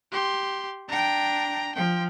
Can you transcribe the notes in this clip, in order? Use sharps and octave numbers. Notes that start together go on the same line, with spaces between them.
G4 C6
D4 G5 A#5
F3 G5